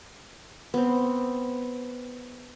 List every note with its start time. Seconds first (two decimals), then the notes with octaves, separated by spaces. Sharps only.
0.74 B3 C4